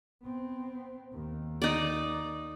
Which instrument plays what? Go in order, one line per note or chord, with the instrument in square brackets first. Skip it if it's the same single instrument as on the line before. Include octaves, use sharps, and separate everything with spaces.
[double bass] B3 C4
D#2
[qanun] D#4 D5